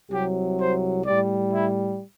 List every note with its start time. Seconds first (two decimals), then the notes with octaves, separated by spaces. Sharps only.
0.10 C2 C3 F#3 G4
0.58 C5
1.05 A2 G3 D5
1.52 E4